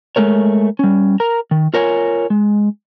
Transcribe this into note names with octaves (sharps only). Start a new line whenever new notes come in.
G#3 A3 A#4 C#5
G3 C#4
A#4 A#5
D#3
F4 A#4 C#5 G5 G#5
G#3